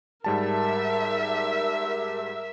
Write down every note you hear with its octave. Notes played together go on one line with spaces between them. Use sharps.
G#2 G3 A#4 E5 A5